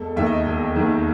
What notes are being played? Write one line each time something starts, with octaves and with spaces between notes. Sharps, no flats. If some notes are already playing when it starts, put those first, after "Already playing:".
Already playing: E1 A4
D#2 D#3 E5
D#5
E1
D#2 D#3